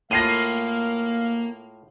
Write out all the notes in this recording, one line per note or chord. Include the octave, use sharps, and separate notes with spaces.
A2 A#3 F4 F5 A#6 C7 D#7